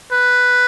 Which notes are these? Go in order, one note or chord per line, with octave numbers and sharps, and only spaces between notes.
B4